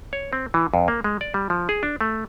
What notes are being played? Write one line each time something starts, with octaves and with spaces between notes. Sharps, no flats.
C#5
C4
E3
F2
A#3
G#3
D5
G3
F3
G#4
D4
A3